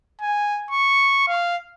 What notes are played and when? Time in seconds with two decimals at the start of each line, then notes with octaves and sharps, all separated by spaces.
0.22 G#5
0.71 C#6
1.27 F5